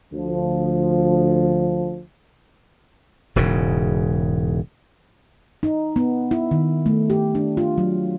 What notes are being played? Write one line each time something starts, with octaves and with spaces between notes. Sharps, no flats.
D2 F3
E1 G#2 C#3
D#4
B3
E4
D#3
A3
G4
D4
F4
F#3